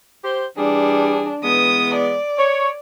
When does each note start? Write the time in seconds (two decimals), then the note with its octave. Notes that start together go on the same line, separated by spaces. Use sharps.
0.24 G4 C5
0.58 E3 G3 D4 G#4
1.44 E3 G#3 B3 D#6
1.95 D5
2.38 C#5